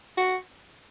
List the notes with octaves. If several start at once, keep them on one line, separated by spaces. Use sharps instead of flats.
F#4